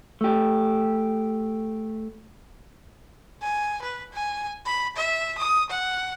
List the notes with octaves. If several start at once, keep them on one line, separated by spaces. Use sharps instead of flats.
A3 G4
G#5
B4
G#5
B5
E5
D#6
F#5